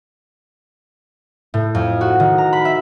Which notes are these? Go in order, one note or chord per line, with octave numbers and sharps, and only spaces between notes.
A2
F2
F#4
D#3
A#5
B5
E5